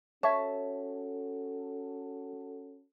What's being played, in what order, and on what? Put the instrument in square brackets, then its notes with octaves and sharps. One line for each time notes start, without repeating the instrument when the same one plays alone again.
[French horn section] C#4 F#4 A4 [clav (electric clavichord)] C#5 [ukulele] E5 A5